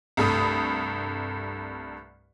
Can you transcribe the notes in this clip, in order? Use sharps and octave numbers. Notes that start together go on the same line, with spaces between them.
C2 G2 A3 B5 D#6